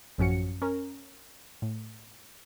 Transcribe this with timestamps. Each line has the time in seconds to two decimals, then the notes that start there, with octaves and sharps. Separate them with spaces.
0.18 A1 F#2 F3 C#4 F#4 C#7
0.62 C#4 A#4
1.62 A2